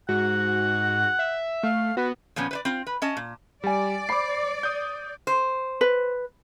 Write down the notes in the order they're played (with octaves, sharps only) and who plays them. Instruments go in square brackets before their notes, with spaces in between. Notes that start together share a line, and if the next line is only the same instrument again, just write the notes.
[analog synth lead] G#2 [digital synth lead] F#4 [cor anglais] F#5
[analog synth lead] E5
[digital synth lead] A3 [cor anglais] F5
[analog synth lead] B3 [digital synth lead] F#4 [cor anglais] B4
[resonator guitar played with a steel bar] A#2 F3 B3 C#4
B4 C5 D5
C4 F4
B4
C#4 D#5 A5
A#2
[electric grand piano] G3 [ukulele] G4 G#5 [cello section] D5
[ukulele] C5 B5 [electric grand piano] D6 C7
[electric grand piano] D#6 G6
[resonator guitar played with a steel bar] C5
[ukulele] B4